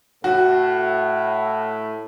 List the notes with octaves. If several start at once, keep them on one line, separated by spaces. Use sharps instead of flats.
A2 F#4